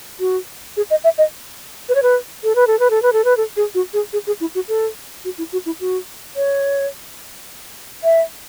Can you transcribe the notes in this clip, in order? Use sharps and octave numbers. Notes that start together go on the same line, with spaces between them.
F#4
G#4
D#5
E5
D#5
B4
C#5
B4
A4
B4
A4
B4
A4
B4
A4
B4
A4
G#4
F#4
G#4
G#4
G#4
E4
F#4
A4
F#4
E4
F#4
E4
F#4
C#5
E5